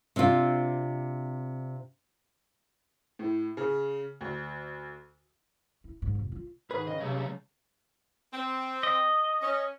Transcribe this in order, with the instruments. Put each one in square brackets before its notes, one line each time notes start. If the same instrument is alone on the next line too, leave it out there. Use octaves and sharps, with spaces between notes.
[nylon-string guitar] C3 C4 D4 F4
[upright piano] A2
C#3
D2
[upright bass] E4
G#2
F1
F4
[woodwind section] G#2 D#3 [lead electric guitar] G#4 [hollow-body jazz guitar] B4
[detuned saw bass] C#3 [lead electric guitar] D#5
[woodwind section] C3 [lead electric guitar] F#3 A3
[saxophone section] C4
[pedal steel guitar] D#5
[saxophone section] C#4